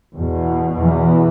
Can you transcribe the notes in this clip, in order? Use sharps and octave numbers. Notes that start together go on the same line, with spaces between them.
E2 B2
E2 E3